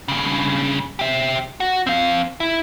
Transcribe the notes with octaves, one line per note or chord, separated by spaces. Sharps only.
G2 C#3
G4 E5
F#4
C4 F5
E4